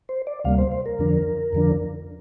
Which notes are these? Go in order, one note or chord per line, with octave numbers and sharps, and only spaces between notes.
C5
D5
D2 C3 G3 A#3 F5
C5
C5
A#4
F2 D3 F3 D4
F2 D3 F3 D4